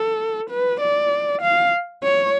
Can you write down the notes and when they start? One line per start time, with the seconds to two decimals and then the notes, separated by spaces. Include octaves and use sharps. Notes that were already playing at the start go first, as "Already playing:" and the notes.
Already playing: A4
0.50 B4
0.80 D5
1.41 F5
2.03 C#5